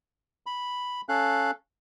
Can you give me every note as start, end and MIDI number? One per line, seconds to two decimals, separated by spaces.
0.46 1.01 83
1.09 1.51 61
1.09 1.51 69
1.09 1.51 77
1.09 1.51 90